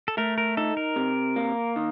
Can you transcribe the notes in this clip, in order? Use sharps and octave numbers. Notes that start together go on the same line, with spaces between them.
A4
A3 A#4
A#4
D#4 A4
A#4
C3
A#3
D#3